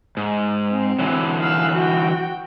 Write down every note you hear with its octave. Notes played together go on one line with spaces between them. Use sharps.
G#2
C4
D3 E3 F#3
F5 E6 F#6
F#4 G5